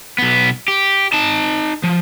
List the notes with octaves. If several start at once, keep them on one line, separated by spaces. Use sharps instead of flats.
B1 B3
G4
D#4 A5
F3